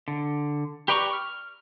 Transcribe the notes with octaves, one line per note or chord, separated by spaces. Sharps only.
D3
G4 B4 D5 A#5 C#6
F6